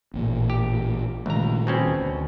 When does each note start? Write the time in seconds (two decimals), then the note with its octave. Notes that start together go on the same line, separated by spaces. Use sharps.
0.14 A1 A#2
0.50 G4
1.26 C#2 A#2 D#3 A3 A#5
1.67 B2 C4 C#4
1.87 D2